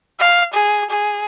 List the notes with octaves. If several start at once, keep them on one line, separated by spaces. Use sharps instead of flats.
F5
G#4
G#4